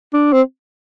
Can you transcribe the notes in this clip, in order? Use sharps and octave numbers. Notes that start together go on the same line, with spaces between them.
D4
C4